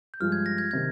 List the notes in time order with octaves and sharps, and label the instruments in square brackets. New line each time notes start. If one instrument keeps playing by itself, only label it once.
[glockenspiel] G6
[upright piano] G2 F3 G#3 [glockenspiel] F6
[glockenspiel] G#6
A#6
G#6
[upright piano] C3 D#3 [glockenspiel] G#6